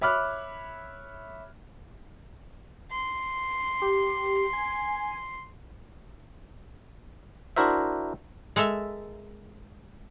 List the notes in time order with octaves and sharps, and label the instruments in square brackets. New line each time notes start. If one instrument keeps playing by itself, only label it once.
[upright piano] C#5 E5 B5 D6 F6 F#6
[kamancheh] C6
[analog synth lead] G4
G#5
[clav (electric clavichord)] D4 E4 F#4 A#4 C5 E5
[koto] G#3 A4 A#4 E5